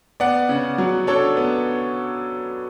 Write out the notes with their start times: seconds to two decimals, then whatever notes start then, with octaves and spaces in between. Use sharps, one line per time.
0.20 B3 D5 F#5
0.49 C#3
0.78 F#3
1.07 D4 A4 C#5
1.37 B3